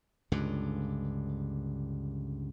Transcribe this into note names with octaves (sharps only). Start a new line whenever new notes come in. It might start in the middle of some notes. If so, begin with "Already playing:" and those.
C#2 G2 D3